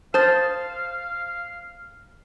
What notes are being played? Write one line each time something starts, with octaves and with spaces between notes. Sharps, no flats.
C5 F5 A5 D#6 A6